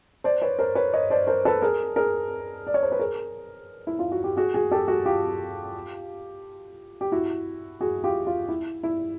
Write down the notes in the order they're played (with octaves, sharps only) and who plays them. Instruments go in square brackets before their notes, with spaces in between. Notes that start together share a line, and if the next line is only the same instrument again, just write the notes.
[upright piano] C5 D5
B4 C#5
A#4 C5
B4 C#5
C#5 D#5
C5 D5
A#4 C5
A4 B4
G#4 A#4
G#4 A#4
D5
C#5
C5
B4
G#4 A#4
E4
F4
F#4
G4
F#4 G#4
F#4 G#4
G4 A4
F#4 G#4
F4 G4
G4
E4 F#4
F#4 G#4
F4 G4
F4
E4
E4